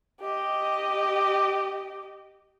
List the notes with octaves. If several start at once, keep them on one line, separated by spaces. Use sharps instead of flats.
G4 D#5